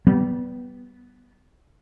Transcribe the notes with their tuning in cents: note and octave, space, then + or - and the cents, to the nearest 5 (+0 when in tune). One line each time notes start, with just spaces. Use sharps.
G3 -25 B3 +0